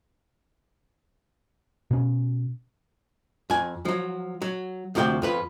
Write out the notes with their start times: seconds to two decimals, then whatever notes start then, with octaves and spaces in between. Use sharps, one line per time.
1.91 B2 C#4
3.50 F2 G#5
3.85 F3 F#3
4.42 F#3
4.95 D2 C3 F3 B4 G5
5.22 F2 F4 B4